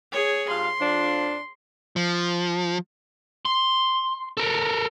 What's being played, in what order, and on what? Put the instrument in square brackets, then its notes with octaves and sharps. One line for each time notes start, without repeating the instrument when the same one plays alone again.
[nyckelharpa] G#4 C#5
[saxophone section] G2 F4 F5 [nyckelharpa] C6
[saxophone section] F2 F3 D4
[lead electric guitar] F3
[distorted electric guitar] C6
A4 A#4